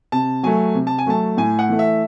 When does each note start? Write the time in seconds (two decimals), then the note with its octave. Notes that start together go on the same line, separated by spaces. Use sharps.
0.12 C3 A5
0.43 F#3 A3 G#5
0.74 C3
0.87 A5
0.98 G#5
1.06 F#3 A3 A5
1.37 A2 G#5
1.59 F#5
1.69 E3 A3
1.79 E5